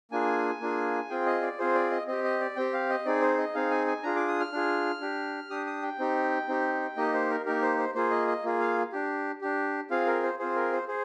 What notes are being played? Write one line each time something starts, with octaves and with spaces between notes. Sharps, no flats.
A#3 D4 F4 G#4 G#5
A#3 D4 F4 G#4
C4 F4 G#4 G5
D#5
D5
C4 F4 G#4 C5
D5
D#5
C4 G4 D#5
D#5
D5
C4 G4 G5
F5
D#5
C4 D#4 G#4 D5
C5
D#5
C4 D#4 G#4 F5
G#5
G#5
D4 F4 G#4 A#5
D6
D#6
F6
D4 F4 G#4
D4 G4
D4 G4 D#6
D#6
G5
C4 D#4 G4
C4 D#4 G4
A#3 D#4 G4 D#5
C5
A#4
A#3 D#4 G4 A#4
C5
C5
A#3 F4 G#4 C5
D#5
D#5
A#3 F4 G#4
F5
D4 G4
D4 G4
C4 F4 G#4 F5
A#4
C5
C4 F4 G#4 C5
A#4
C5
G#4 C5